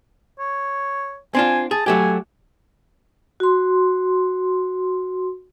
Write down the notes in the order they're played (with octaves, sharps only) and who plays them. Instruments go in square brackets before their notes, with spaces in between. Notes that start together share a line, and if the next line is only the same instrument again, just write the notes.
[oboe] C#5
[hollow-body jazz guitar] C4 D4 F4 [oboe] G#5
[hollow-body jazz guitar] G#4 [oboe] A5
[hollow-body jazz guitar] F#3 A3 G4 [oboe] G#5
[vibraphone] F#4 C6